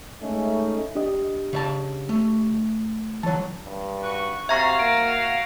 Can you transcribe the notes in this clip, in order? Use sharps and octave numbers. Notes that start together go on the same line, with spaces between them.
G#3 A3 C#4 D#4
D4 G4 D#5
C#3 E5 A5
A3
E3 F#3 C#5 A5
G2
F#4 B4 C#6
C3 F#4 E5 F5 A#5 C#6 G#6 A#6
A#3 D7